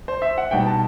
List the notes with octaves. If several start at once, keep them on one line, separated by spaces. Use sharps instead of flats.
C5
E5
F#5
B2 G3 D#4 G5
A5